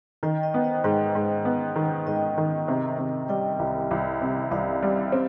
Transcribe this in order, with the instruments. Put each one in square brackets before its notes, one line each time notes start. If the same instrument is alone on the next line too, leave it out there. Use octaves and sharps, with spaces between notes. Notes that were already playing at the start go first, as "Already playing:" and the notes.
[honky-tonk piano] D#3 [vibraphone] D#5 G5
[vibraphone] D#5 G5
[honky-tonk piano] B3
[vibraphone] C5 D#5
[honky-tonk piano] G#2 [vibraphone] D#5 G5
[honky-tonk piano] G#2
B3
D#3
[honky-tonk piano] G#2 [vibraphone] D#5 G5
[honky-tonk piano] D#3
C3
C3
[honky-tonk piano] G3 [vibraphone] D#5 G5
[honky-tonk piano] C2
C2
C3
[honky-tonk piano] C2 [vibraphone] D5 F5
[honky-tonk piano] G3
C4